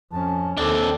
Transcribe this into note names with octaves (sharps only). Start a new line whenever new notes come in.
F2 C#4 A5
D#2 D#3 C4 D4 A4 D5